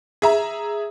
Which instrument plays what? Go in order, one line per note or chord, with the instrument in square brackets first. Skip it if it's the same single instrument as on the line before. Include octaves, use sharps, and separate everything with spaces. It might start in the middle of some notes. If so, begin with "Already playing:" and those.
[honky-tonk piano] G#4 E5 A#5